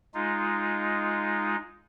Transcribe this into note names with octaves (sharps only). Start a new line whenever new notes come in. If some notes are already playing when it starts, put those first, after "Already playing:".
G#3 D#4 F4